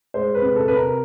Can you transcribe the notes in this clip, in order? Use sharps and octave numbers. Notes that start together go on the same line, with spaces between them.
G#3 C5
B4
C3
A4
C3 B4
A#4